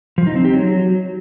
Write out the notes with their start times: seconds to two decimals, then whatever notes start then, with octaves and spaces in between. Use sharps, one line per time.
0.18 F3
0.27 D#4
0.36 C4
0.45 G4
0.53 F#3